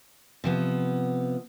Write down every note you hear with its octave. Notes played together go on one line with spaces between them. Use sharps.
C3 F3 B3